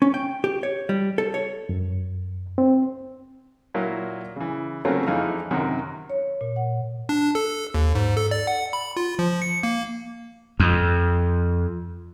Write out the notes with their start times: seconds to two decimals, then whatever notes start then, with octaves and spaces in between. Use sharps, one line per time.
0.02 C#4
0.14 G5
0.44 G4
0.63 C#5
0.89 G3
1.18 A4
1.34 C#5
1.69 F#2
2.58 C4
3.74 A#2 F#3 A#3 E4
4.36 C#3 E3
4.85 C#3 F#3 A3 A#3 C4 C#4
5.07 F2 E3 G#3 D#4 F5 F6
5.51 F#2 C3 D#3 F#5 A#5
6.10 C#5
6.41 A#2
6.56 F#5
7.09 D4
7.35 A4
7.74 D#2
7.95 G#2
8.17 A4
8.31 D5
8.47 F#5
8.73 B5
8.97 F4
9.19 F3
9.42 C#7
9.63 A#3
10.60 F2